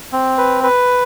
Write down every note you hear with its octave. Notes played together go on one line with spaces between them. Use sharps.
C4
B4
B4